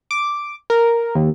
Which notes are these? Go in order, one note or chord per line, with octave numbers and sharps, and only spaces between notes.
D6
A#4
D#2